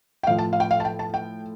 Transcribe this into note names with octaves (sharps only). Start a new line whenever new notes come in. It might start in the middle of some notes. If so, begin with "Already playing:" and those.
G5
A2 F3 F5
A5
F5
G5
F5
A5
G5
A5
G5